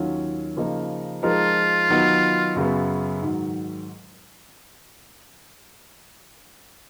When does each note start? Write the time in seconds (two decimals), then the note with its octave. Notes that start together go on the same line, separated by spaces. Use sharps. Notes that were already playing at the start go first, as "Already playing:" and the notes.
Already playing: D#2 D#3 F#3 C#4 F4
0.56 C#3 F3 A#3 D#4 A#4
1.23 F3 G#3 D#4 F4 A#4
1.89 D#3 F#3 B3 D#4
2.56 F#2 C#3 F#3 B3
3.22 G#2 D#3 F#3